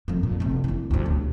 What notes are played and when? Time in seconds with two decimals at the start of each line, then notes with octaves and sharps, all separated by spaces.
0.08 F2 A#3
0.23 A#2
0.40 F1 C4
0.64 E3 C4
0.91 D2 F3
1.06 D#1